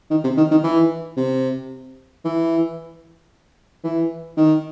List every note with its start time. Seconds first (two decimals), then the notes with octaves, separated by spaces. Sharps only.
0.11 D#3
0.24 C3
0.37 D#3
0.51 D#3
0.64 E3
1.17 C3
2.25 E3
3.84 E3
4.37 D#3